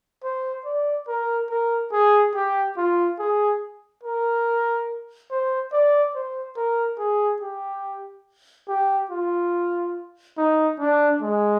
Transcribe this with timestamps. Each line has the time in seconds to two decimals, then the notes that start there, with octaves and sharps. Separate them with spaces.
0.24 C5
0.65 D5
1.08 A#4
1.50 A#4
1.92 G#4
2.34 G4
2.77 F4
3.19 G#4
4.03 A#4
5.31 C5
5.72 D5
6.15 C5
6.56 A#4
6.99 G#4
7.41 G4
8.68 G4
9.11 F4
10.37 D#4
10.80 D4
11.22 G#3